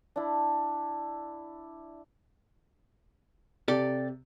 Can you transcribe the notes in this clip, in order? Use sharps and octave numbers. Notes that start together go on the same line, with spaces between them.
D4 E4
C3 G4 A4 D5